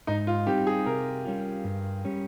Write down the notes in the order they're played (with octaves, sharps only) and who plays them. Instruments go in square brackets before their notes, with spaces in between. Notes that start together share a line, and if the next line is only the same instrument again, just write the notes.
[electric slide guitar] G#2 [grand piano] D#4
[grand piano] F4
[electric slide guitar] G3 C4 D#4 [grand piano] G4
[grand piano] G#4
[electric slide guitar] C3 [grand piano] A#4
[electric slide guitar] G3 C#4 F4
G2
G3 C#4